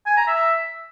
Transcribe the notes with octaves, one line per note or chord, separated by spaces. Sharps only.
G#5
A#5
E5